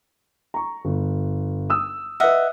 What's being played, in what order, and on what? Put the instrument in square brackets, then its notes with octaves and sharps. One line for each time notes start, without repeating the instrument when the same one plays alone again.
[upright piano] A#5 C#6
G1
D#6 E6
[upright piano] B4 F6 [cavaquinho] D#5 E5 F#5